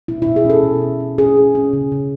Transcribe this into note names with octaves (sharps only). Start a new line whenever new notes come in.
B2 E4
B2 E4
G#4
C#4 A4
B2
C#4
C#4
C#4 G#4
C#4
C#4
C#3
C#3